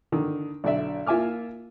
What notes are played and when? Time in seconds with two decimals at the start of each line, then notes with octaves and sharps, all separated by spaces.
0.12 D3 D#3
0.64 B1 D3 D5 E5
1.07 A#3 F4 E5 G#5 D6 F6